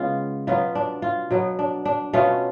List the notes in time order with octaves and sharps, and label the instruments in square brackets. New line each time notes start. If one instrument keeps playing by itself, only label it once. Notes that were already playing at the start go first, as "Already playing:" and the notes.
Already playing: [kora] C#3 G#3 B3 F4
B2 F#3 B3 F4
D4
F4
B2 F#3 B3
D4
D4
B2 A3 C#4 F4